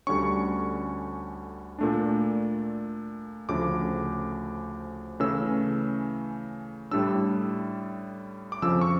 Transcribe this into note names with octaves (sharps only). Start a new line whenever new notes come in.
D2 D3 G3 C#4 C#6
A#2 A3 D4
D2 C#3 F3 A3 D6
C#3 E3 A3 C#4 E6
A2 G3 D4 E6
D6
F2 C#3 F3 C#4 E6
C#6